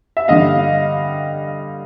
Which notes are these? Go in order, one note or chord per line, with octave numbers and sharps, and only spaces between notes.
E5
G2 D3 G3 D#5 F5